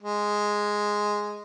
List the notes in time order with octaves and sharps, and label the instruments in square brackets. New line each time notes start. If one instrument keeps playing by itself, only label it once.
[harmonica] G#3